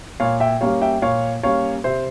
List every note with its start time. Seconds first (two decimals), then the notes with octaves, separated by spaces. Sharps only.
0.20 A#2 C#5 F5
0.40 E5 G5
0.61 G3 A#3 C#4 C#5 F5
0.81 E5 G5
1.02 A#2 C#5 F5
1.43 G3 A#3 C#4 C#5 F5
1.84 C3 C5 E5